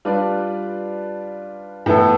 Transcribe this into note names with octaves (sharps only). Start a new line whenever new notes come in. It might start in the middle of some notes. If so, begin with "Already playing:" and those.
G3 D4 F4 B4 D5
A2 E3 B3 E4 A4